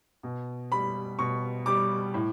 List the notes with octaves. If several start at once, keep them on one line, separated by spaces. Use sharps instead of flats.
B2
G3 B5
B2 C#6
G3 D6
A2